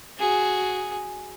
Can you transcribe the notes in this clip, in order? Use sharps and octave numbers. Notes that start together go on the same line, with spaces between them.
F#4 G#4